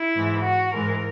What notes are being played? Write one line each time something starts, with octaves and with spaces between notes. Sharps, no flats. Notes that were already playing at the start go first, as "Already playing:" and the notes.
Already playing: E4
G#2 E3 G#3
F#4
G#2 E3 G#3 A#4